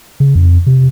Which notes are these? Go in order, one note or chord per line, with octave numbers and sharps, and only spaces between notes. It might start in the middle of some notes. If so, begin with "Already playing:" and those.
C#3
F2
C3